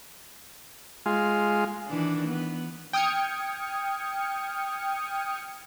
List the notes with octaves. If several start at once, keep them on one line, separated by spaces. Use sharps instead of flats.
G#3 F4
D#3 E3 D4
B3
G5 D#6 F6 G#6 C#7